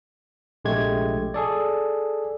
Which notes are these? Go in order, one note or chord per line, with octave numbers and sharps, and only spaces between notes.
A#1 C3 G#3 A3 G4 G#6
G#4 A4 D5